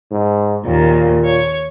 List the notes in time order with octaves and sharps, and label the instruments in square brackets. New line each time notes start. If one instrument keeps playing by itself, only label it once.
[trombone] G#2
[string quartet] D#2 [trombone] A#2
[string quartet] C#5